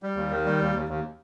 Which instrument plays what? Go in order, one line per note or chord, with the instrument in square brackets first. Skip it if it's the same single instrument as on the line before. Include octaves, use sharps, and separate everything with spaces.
[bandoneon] G3
D#2
D#3
G3
D#2
D#2
D#2